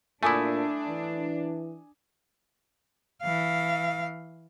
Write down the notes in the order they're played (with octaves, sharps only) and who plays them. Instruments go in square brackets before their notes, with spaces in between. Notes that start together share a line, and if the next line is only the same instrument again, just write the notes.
[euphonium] A#2 [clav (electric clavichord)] A3 E4 [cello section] D4 [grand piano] G#5 D6 D#6
[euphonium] E3
[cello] E3 F5